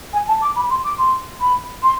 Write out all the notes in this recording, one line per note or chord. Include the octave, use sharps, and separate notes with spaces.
G#5
A5
D6
B5
C6
D6
C6
B5
C6